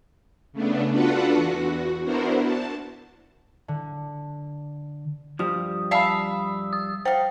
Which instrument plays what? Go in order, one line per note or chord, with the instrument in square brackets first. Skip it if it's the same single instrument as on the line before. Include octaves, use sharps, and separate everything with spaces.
[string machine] C#3 A3 B3 D4
D4 F4 F#4 A4 B4 F#5
E2 F#4
B3 D4 E4 F#4 A#4 C5
A5
[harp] D3
[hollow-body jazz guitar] G2 F3 G3 [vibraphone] D#6
[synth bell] D5 B5 [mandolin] E5 F5 A5
[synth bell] D#6
[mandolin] D#4 F5 [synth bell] C5 [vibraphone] G5